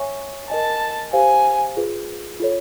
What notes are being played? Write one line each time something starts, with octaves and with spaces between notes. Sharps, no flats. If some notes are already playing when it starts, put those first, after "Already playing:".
Already playing: C#5 E5 G#5 C#6
A#4 D#5 G#5 A5
G4 C5 F5 G#5
F4 G#4 B4
F4 A4 C#5